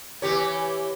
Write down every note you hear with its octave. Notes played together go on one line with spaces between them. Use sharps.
E3 G4 C#5